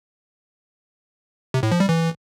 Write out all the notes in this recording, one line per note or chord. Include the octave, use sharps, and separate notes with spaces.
C3
A2
F3
G3
E3